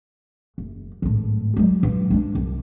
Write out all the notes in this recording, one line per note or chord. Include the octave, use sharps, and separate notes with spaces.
F#1
G#1 A2
F#3 G#3
G2 F4
G#3 D4
C2